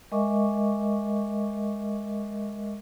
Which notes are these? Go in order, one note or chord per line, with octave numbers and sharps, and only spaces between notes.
G#3 A#4 D#5 E5 C#6 D6